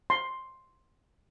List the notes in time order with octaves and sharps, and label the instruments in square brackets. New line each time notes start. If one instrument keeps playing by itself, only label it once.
[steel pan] C6